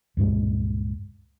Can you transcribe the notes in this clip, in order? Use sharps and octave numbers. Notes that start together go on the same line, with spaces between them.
C#2 G2 A#2 G#3